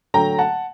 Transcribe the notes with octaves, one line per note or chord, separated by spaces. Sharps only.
D3 F#3 A3 G5 A#5
F#5 A5